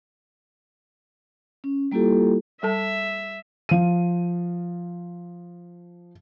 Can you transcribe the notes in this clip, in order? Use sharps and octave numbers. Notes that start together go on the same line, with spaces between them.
C#4
G3 A#3 E4 F4 G4 A4
G3 A4 E5 A5
F3 D#7